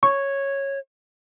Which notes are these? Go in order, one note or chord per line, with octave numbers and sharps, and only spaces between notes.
C#5 C#6